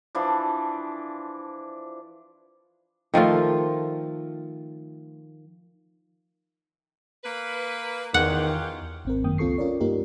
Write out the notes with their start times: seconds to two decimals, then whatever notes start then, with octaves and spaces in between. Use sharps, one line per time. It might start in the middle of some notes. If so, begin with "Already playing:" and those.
0.15 E3 F3 D4
3.14 D#3 F3 A3 F4
7.24 A#3 B4
8.14 E2 D#3 C#4 F4 G4 F#5
9.05 G#1 C4 A#4
9.24 F#2 D#3 A#3 G5 D#6
9.38 C#2 C4 F4 A4 C#6 C7
9.58 C#4 F4 A#4 C#5 D5
9.80 G2 A#3 D#4 F4 G4 A#4